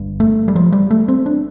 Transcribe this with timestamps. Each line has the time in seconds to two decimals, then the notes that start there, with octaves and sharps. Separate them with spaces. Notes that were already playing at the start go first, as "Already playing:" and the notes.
Already playing: G1 G2
0.20 A3
0.48 G3
0.55 F3
0.72 G3
0.90 A3
1.08 C4
1.26 D4